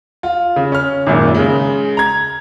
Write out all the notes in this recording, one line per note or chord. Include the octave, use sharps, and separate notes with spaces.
F4
C#3
C#4 F6
G#1 F#2 A#2
C#3 G#3
A#5 G#6